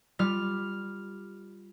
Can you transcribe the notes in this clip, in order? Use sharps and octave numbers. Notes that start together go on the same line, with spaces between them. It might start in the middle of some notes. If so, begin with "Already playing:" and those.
G3 F4 F6